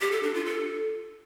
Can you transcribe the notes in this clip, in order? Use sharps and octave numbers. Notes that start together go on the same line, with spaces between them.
G4
A4
D4
F4
A4